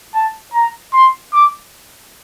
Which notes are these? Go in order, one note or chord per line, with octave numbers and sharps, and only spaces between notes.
A5
A#5
C6
D6